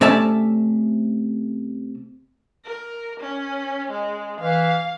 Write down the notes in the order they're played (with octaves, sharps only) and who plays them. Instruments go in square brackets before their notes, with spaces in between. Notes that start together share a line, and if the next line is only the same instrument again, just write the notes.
[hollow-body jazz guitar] C3 A3 C#4 D5 E5 A5
[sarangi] A#4
C#4
G#3
[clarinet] E3 [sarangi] F5